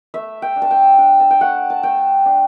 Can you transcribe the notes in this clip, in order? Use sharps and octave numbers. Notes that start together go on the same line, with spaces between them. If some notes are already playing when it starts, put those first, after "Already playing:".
A3 E5
G5
D4
A5
G5
D4 G5
A5
G5
A3 F#5
A5
A3 G5
D4